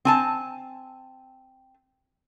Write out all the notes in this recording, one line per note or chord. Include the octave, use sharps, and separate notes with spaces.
C4 G#5 A5